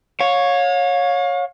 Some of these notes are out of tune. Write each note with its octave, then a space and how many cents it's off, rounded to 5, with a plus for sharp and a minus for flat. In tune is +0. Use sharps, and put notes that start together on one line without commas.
C#5 +0 F5 +35